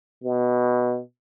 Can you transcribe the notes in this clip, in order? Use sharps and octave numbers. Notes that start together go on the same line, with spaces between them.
B2